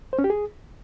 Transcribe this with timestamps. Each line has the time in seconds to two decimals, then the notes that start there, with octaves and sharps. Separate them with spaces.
0.13 C5
0.19 C#4
0.24 G4
0.30 G#4